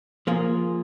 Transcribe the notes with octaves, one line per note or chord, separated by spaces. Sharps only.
F3 A#3 F4 G#4